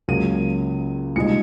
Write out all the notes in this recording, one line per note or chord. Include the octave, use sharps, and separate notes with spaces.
C#2 C#3 F#3 A#3 D#7
C2 A#2 G#3 D#4 C#7